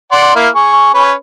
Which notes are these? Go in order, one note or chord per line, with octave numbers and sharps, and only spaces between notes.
D5 F#5 C6
A#3 E4 F5
G#4 C#6
C#4 B4 C#5